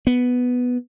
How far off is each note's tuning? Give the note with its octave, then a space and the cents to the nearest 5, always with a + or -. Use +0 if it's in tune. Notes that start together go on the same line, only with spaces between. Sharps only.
B3 +0